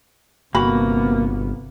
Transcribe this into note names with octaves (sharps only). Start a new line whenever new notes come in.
G1 C3 A#3 B3 F#4 B5